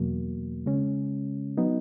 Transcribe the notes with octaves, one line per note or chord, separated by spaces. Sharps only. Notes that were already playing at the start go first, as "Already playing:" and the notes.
Already playing: E2 B2 F#3 A#3
C#3 G#3 C#4
F#3 B3 D#4